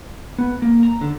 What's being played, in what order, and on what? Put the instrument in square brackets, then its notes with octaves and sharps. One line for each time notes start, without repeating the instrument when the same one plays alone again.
[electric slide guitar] B3
A#3
A#5
D3